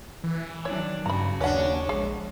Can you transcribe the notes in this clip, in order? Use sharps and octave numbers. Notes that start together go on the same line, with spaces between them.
E3
D#3 F#3 D4 C#5
G2 C#3 F#4 A#5 B5
D#2 C#4 D4 B4 F#5
A#1 G#3 G#4